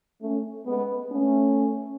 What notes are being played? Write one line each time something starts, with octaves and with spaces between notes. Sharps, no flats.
A3 C#4
G#3 B3
A3 C#4